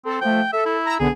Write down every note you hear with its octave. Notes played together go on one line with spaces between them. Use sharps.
C4 A4
F3 A3 G5
A4 E5
E4
A#5 E6
B1 D3 B3 G#4